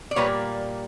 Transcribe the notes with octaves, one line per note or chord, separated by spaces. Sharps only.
D5
A#2 G3 A#3 B4 C#5